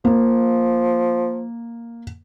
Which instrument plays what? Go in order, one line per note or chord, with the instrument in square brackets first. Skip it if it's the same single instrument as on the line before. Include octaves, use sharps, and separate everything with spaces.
[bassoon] F3 [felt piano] A#3